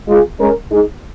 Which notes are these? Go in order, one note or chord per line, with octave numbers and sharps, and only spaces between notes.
G#3 F4 G#4
G#3 C#4 A#4
G#3 D#4 G#4